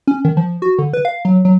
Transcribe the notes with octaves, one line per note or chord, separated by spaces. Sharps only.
C#4
D#3
F3
F#4
D3
B4
F5
F#3
F#3